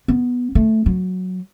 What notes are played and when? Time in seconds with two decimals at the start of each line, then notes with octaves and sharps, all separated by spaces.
0.08 B3
0.55 A3
0.86 F#3